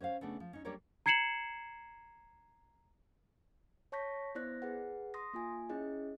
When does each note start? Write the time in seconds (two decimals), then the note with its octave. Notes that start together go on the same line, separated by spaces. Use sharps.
0.01 C#4 C5 D#5 F5
0.21 C#3 A3 B3 D4
0.40 F3
0.53 C#4 D#4
0.65 G3 A#3 D4 G4 A#4 C#5
1.06 A#5 G#6 C7 C#7 E7 F#7
3.92 C#5 A5 C#6 G6 A#6 B6
4.35 B3 E4 C5 D5 F#6 A#6
4.62 G#4 B4 F#5
5.14 C6 D#6 A#6
5.33 A#3 F4 G#5
5.70 C#4 E4 G#4 D#5